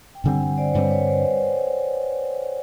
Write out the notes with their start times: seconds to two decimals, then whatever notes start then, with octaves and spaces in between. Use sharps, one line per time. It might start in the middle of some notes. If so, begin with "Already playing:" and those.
0.15 G5
0.24 G2 D3 G3 C4 F#5 G#5
0.58 C5 D5
0.74 G2 D3 G3 C4 B4 C#5
0.90 B4 C#5
1.07 C5 D5